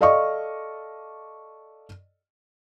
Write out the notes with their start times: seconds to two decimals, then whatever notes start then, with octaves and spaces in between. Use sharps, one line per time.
0.01 A4 D5 D#5 F5 C#6